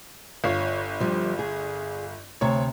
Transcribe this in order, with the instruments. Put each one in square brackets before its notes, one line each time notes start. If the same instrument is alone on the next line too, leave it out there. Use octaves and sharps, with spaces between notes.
[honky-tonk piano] G1 F4 C7 [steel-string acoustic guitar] C#5
[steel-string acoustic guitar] F3 G3
G#4
[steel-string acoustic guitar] D2 C3 [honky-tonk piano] C#5